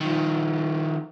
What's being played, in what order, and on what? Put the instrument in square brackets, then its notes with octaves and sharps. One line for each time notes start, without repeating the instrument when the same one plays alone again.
[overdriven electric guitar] D#3 F3